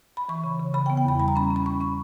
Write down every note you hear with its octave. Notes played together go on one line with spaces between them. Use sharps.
B5
E3 C#6
C#3
C#3
C#3 B5
G5
B3
G5
E2 B5
G3 B5
A#5
C#4 B5
C#4
B5
C#4 C#6
C#4 C#6